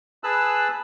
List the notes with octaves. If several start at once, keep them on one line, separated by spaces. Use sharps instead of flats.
G#4 B4 A5 E6 F#6